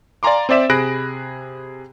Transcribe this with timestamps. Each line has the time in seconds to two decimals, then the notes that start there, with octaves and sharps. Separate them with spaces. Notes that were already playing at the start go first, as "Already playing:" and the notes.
0.23 D5 F5 G#5 A#5 C6 D6
0.49 C4 C5 D5 E5 E7
0.70 C3 G#4 B5 F#6 A#6 D7